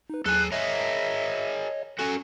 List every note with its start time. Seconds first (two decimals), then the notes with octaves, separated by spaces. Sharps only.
0.10 D#4 B4
0.26 D#2 F#3 G#4 A4 G#5 F#6
0.52 G#4 A#4 C#5 D#5 E5
1.99 C#4 F#4 A4 G#5